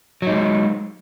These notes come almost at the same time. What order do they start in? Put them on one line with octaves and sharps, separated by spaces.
F#3 D#4 G#3